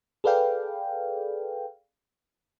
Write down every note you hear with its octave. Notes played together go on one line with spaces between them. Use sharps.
G#4 A4 B4 D5 F5 G5